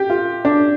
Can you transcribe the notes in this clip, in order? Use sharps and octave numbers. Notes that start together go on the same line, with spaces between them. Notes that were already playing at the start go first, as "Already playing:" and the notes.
Already playing: G4
F4
D4